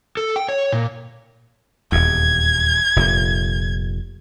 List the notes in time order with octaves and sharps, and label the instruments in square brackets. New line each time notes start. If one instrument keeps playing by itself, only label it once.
[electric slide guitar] A4
G5
C#5
A#2
[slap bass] D#1 E2 [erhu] G#6
[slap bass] F1 A#2